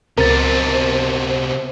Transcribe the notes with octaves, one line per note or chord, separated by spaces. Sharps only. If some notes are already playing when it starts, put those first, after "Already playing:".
C#2 C3 B3 A#4 C5 A6